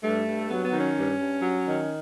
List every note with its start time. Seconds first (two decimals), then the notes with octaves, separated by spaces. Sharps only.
0.04 G2 A3
0.26 G2
0.49 F#3 B3
0.65 B3
0.72 D#3
0.80 C#4
0.96 G2
1.19 G2
1.42 F#3
1.66 D#3